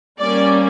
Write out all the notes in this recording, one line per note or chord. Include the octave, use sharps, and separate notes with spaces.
G3 A#3 C#4 D5